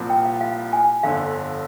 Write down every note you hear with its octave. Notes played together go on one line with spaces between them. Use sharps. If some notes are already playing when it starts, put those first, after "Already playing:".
Already playing: C2 A#2 F3 C4
G5
F5
F5
G#5
G1 F2 D3 F5